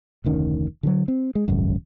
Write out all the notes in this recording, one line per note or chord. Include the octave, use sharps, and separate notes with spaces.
F1 D2 D#3 C#4
D3 F3 F#3
C4
G#3
D#1 G#1 C#2 F#2